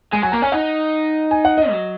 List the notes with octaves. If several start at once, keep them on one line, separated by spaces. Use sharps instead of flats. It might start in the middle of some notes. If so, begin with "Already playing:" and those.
G#3 G#5
F#3 G#5
A#3 A#5
C#4 G#5
D#4 F#5
G#5
F#5
D#5
F#3